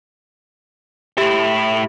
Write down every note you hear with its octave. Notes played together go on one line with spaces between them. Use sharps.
A2 E4 G4